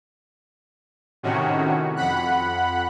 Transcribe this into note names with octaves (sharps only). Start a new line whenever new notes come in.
A2 C3 D#3 C#4 F#4
F2 F#5 B5 F#6